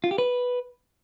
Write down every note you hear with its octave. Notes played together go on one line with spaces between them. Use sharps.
F4
G4
B4